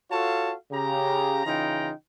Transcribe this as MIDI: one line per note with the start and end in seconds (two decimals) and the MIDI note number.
0.11 0.54 65
0.11 0.54 66
0.11 0.54 69
0.11 0.54 73
0.11 0.54 77
0.11 0.54 81
0.72 1.44 49
0.72 1.44 67
0.72 1.44 82
1.45 1.91 49
1.45 1.91 52
1.45 1.91 63
1.45 1.91 65
1.45 1.91 79
1.45 1.91 82